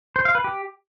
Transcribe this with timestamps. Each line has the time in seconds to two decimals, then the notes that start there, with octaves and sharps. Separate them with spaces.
0.16 C5
0.25 F5
0.35 B4
0.44 G4